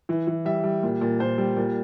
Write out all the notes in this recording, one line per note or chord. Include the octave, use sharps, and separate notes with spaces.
E3
E3
G3 E5
G3
A#2
A#2
A#2 C5
G3
A#2